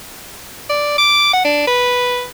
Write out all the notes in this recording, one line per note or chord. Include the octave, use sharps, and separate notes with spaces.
D5
D6
F#5
D4
B4